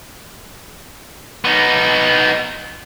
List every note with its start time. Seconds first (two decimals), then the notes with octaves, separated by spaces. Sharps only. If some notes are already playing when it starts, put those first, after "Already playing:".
1.45 B3 D#4